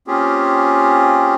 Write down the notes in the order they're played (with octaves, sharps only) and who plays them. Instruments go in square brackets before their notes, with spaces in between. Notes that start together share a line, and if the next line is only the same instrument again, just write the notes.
[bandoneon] A#3 C4 C#4 F4 G4 G#4